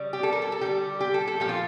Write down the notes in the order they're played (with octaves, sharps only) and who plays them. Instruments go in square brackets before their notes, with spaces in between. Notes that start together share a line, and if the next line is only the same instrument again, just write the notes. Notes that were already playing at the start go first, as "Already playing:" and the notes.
Already playing: [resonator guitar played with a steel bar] C#3 G3
G4
A4
A#4
A4
A4
D3 G3 G4
G4
A4
A4
A#2 F3 A3 G4
F4